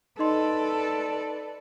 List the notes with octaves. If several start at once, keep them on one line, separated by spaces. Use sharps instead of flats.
D#4 A4 B4 D5 D#5 C6